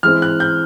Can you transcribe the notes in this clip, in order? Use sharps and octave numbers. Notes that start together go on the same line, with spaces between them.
E3 G#3 C4 F6
F#6
G6